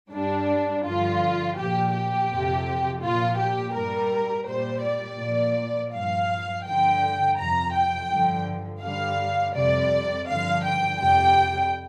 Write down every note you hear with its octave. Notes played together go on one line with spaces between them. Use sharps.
G2 G3 D4
G2 D3 F3 F4
A#2 F3 G4
G4
F2 C3 F3
A#2 F3 F4
G4
G2 G3 A#4
A#2 G3 C5
D5
A#2 F3
G2 F3 F5
G2 D3 F3 G5
F2 C3 F3 A#5
G5
G2 D3 F3
G2 D3 G3 F5
F2 C3 G3 D5
G2 D3 F3 F5
G5
F2 C3 G3 G5